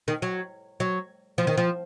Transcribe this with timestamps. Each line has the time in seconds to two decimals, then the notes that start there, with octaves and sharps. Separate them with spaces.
0.08 D#3
0.22 F#3
0.80 F#3
1.38 F3
1.47 D#3
1.58 F3